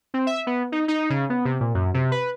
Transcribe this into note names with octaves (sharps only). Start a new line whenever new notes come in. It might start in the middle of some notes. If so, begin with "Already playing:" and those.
C4
E5
B3
D#4
D#4
C#3
B3
C3
A#2
F#2
C3
B4